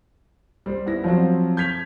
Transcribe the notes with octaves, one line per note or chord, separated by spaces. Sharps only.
G3 C5
B3 E4 A#6
F3 F#3 C4
G6 G#6 B6 F7